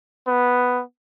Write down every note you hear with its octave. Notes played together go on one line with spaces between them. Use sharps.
B3